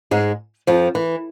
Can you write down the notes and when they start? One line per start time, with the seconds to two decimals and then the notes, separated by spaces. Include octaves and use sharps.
0.11 G#2 G#3
0.67 F2 F3
0.95 E3